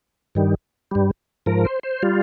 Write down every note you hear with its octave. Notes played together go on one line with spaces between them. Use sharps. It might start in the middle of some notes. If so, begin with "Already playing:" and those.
G2 D#3 G3
G2 G3
G#2 F3 A#4
C5
C5
G3 F4